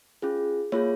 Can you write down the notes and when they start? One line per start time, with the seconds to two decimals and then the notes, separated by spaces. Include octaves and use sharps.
0.22 C#4 F4 G#4
0.72 A#3 F4 G#4 C#5